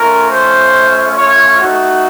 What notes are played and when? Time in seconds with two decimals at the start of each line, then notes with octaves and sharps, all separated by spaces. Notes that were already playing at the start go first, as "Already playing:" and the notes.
Already playing: A3 C#4 F4 A#4
0.30 C5
1.17 C#5
1.59 A3 D#4 F#4